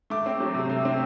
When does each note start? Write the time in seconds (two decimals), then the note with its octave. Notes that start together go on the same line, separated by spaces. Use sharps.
0.10 A3 D6
0.26 C4
0.40 F#3
0.54 C3
0.69 A3
0.85 C4